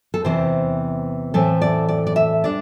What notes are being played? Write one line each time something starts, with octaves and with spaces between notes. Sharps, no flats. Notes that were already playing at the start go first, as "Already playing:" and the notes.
A4
E2 C3 E3 C4 C5
A2 E3 A3 C4 A4
D5
D5
D5
E5
G3 D4 D5